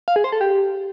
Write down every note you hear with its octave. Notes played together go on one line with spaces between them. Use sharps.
F5
G#4
C5
A4
G4